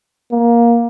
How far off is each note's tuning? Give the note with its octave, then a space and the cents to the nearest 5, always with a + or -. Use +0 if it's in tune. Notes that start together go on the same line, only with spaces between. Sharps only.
A#3 +15